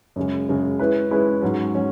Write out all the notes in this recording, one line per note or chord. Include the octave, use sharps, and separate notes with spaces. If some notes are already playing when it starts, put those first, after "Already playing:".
F#2 C#3 G#3
F#2 C#3 G#3
G#3 C#4 E4 B4
G#3 C#4 E4 B4
G#2 F#3 C#4
F#3 C#4